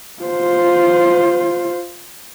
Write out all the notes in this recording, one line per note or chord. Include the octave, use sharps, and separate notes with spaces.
F4 C5